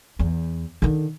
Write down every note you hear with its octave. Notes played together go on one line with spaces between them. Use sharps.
E2
D3 D#3